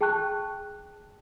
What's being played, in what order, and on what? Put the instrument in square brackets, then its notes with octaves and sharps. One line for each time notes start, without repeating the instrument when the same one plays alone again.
[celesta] G#4 G5 A5 C#6 F#6